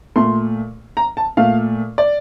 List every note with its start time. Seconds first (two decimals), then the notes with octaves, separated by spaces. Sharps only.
0.16 A#2 A3 C6
0.97 A#5
1.17 A5
1.37 A#2 A3 F5
1.98 D5